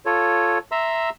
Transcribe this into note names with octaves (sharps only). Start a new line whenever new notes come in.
F4 A4 C#5
E5 A#5 C6 E6